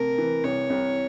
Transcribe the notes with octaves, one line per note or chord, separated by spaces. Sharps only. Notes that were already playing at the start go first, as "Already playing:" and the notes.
Already playing: C3 A3 A#4
E3
C2 C#5
C2